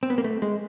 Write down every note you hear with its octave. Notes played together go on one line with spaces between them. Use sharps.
C4
B3
A#3
A3
G#3